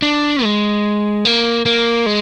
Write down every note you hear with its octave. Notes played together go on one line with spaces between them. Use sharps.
D4
G#3
A#3
A#3
G#3